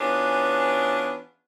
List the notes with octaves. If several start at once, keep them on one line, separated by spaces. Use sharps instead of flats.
E3 B3 C#4 D4 F4 G#4